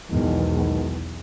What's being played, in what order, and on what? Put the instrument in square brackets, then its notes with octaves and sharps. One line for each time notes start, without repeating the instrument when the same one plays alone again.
[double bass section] B1 E2 [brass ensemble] G#2 B2 D#3